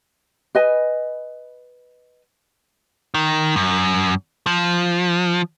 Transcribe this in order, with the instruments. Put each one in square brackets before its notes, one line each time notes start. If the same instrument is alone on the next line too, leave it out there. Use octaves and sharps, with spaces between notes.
[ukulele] B4 D#5 G#5
[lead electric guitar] D#3
F#2
F3